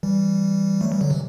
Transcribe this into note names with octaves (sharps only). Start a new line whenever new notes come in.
E3 G3
F#3 A3
E3 G3
D3 F#3
C3 E3